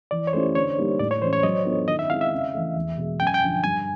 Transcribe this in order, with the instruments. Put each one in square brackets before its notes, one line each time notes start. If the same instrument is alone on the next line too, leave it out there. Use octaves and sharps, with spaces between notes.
[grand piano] E3 [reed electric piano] D5
[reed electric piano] C#5
[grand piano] A3 C#4 E4 G4 [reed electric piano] C5
[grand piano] D3 [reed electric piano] C#5
[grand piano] G3 A#3 D#4 G4
[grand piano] A2 [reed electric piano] D5
[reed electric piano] C#5
[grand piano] E3 G#3 C#4 [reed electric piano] C5
[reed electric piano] C#5
[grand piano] F#3 [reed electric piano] D#5
[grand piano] B3 D4 F4 A4
[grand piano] D#3 [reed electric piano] D#5
[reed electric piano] E5
[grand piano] G#3 C4 E4 G#4 [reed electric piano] F5
[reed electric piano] E5
[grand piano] C#3
E3 A3
E2
B2 G#3
[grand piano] F#2 [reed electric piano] G5
[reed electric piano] G#5
G5
[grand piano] D3 F3
[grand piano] G2 [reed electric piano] G#5